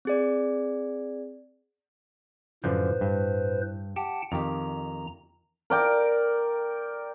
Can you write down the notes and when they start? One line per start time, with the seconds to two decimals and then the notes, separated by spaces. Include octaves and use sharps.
0.05 C4 G#4 D5
2.64 F#2 A2 D3 F3 B4 C5
3.01 G2
3.96 G4 F#5 G5 A5
4.32 F2 D#3 G4 A#5
5.70 A#4 D5 G5